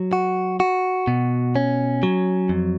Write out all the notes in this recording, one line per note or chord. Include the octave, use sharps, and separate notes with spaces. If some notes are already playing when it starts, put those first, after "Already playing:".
Already playing: F#3
F#4
F#4
B2
C#4
F#3
F2